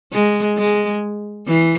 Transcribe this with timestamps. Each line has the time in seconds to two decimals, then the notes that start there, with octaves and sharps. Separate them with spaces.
0.13 G#3
0.58 G#3
1.47 E3